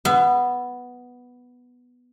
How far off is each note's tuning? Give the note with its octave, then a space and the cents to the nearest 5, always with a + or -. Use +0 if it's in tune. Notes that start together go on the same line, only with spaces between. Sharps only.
B3 +0 E5 +40